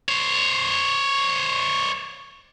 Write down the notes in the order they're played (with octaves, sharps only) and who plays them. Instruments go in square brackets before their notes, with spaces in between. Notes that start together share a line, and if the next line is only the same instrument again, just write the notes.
[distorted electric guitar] C5 C#5